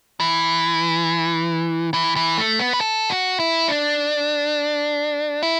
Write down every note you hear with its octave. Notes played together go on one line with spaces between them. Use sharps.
E3
E3
E3
A3
B3
B4
A4
F#4
E4
D4
E4